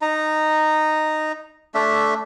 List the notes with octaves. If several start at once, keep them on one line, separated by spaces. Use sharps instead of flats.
D#4 A#5
A3 D4 E5